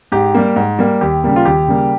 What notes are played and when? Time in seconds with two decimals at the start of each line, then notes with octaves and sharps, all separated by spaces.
0.12 G#2 G4
0.34 G3 A#3
0.56 G#2
0.79 G3 A#3
1.01 D#2 G4
1.24 C#3 G3 A#3
1.36 F4
1.45 D#2 G4
1.68 C#3 G3 A#3